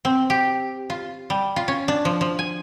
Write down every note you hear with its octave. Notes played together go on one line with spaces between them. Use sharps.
C4
G4
F4
G3
F4
C#4
D4
F3
F3
G#5